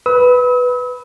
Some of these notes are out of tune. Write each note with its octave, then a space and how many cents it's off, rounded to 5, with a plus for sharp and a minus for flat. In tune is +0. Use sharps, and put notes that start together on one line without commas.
B4 +0 E6 -45